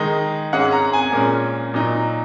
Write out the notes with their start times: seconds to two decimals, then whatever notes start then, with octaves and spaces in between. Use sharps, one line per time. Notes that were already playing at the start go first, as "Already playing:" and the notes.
Already playing: D#3 G#3 D#4
0.53 G#2 G#3 C#4 F#5
0.72 A#5
0.93 G#5
1.13 A#2 G#3 C#4 A#4
1.74 A#2 F#3 D#4